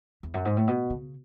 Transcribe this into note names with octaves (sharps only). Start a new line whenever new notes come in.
E2
F#2
G#2
A2
B2
C#3